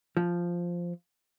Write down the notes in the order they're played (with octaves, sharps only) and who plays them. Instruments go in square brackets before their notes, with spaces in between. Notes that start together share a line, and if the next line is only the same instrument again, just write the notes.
[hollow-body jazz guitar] F3